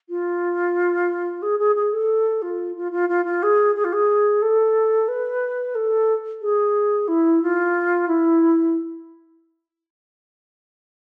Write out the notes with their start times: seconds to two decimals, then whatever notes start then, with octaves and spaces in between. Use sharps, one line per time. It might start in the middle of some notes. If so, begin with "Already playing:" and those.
0.09 F4
1.42 G#4
1.59 G#4
1.76 G#4
1.93 A4
2.42 F4
2.76 F4
2.92 F4
3.09 F4
3.25 F4
3.43 G#4
3.75 G#4
3.84 F4
3.93 G#4
4.42 A4
5.08 B4
5.75 A4
6.42 G#4
7.08 E4
7.42 F4
8.08 E4